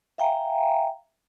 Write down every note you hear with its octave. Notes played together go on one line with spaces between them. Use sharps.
E5 F5 G5 G#5 A#5